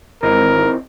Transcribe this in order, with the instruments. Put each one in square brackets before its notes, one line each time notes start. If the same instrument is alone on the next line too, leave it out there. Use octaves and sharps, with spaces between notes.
[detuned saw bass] G#1 [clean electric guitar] E3 C4 D#4 [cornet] A#4